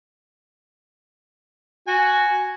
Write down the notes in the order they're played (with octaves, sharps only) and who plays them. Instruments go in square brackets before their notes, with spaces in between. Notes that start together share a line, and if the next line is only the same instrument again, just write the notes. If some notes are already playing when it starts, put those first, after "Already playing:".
[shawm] F#4 [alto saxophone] G#5